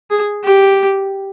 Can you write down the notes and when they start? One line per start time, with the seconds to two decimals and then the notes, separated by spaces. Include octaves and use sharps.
0.11 G#4
0.44 G4